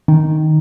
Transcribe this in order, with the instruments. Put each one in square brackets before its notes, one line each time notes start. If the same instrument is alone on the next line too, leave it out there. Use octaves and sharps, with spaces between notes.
[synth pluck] D#3